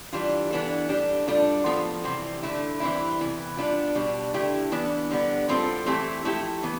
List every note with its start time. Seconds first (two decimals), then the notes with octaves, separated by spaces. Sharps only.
0.13 E3 G3 D4 F4
0.51 E3 B3 D4 A4
0.89 A2 G3 D4 G4
1.28 A2 G3 D4 F4 A4
1.66 A2 F3 B3 F4 A4
2.04 C3 E3 G3 C4
2.43 D3 A3 E4
2.80 E3 G3 C4 E4
3.19 C3 E3 B3
3.57 G3 B3 D4 F4
3.95 B2 G3 D4
4.34 D3 A3 E4 G4
4.72 E3 B3 D4
5.10 D3 G3 B3
5.49 A2 G3 C4 F4 A4
5.86 E3 A3 C4 E4 G4
6.25 F3 A3 E4 G4
6.63 E3 B3